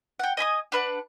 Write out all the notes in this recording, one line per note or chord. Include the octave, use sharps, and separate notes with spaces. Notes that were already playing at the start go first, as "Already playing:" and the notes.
F#5 G5
D#5 G#5 B5 D#6
D4 B4 F#5